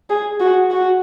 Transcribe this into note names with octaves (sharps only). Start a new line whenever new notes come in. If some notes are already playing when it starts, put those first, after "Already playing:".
G#4
F#4
F#4